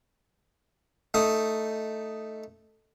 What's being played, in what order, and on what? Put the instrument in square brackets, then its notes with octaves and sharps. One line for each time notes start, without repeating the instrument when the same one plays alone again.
[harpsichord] A3 D#4 D#6